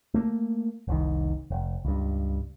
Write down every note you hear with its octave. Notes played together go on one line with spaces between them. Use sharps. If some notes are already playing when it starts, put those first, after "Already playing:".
A3 A#3
F1 C2 D#3
F1
C#2 G2